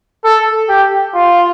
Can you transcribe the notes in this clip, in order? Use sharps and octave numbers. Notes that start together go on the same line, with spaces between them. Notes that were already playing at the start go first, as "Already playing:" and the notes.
A4
G4
F4